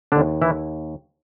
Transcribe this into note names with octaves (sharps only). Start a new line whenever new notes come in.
D#2 D3 D4
E3 E4